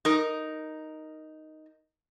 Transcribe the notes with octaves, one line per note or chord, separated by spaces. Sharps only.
D#4 A#4